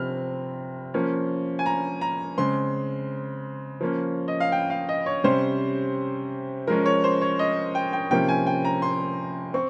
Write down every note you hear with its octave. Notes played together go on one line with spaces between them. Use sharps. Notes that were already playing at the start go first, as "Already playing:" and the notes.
Already playing: C3 F3 C4 F6
F3 A#3 C#4
G#5
A#5
A#5
C#3 G#3 C4 C6
F3 A#3 C#4
D#5
F5
G5
F5
D#5
C#5
C3 G3 C#4 C5
F3 G#3 C#4 A#4
C#5
C5
C#5
D#5
G5
G5
C3 F3 A#3 C#4 G5
G#5
G5
A#5
C6
C4 C#6